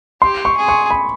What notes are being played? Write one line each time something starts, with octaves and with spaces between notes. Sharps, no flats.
G4 C6
C#6
G#4
C#6
B5